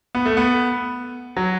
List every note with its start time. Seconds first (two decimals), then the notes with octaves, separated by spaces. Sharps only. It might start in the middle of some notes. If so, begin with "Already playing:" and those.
0.15 B3
0.26 A3
0.37 B3
1.36 F#3